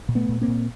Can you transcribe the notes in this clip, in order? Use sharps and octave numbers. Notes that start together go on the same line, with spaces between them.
A#2
A3 B3
A#2
A#3 C4
A#2